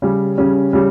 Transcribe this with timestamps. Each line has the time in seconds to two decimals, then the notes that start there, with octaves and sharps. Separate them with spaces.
0.02 C#3 G3 C#4
0.38 C#3 G3 C#4
0.73 C#3 G3